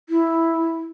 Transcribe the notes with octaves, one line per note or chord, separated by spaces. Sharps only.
E4